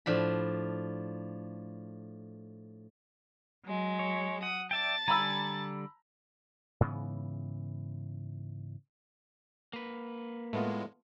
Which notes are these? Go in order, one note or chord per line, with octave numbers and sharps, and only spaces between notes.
A2 F3 D4 B5
F#3 G#3
C#5
F#5 D#6
D5 E5 G5 A5 A6
D3 G3 G#5 A#5 B5 E6
G#2 C#3 E3 B3
A#3 B4
A2 G#3 A3 B3 F4